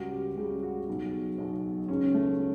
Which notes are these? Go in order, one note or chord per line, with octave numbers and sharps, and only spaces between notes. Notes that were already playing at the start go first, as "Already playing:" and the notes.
Already playing: C#2 C#3 G3 F#4
G4
C#2 C#3 G3 G4
F#4
B1 B2 F#3
B1 B2 F#3
C#2 C#3 F#3 C#4
A3
F#3